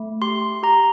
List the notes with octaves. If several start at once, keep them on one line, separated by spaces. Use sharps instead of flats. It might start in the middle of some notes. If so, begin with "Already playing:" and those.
Already playing: A3
G4 C6
G4 A#5